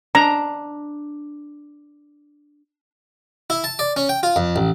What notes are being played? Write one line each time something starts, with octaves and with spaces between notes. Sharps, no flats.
D4 A#5
E4
A5
D5
C#4
G5
F4
F2
A1